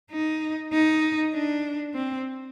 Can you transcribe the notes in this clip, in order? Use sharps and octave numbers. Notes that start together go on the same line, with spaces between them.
D#4
D#4
D4
C4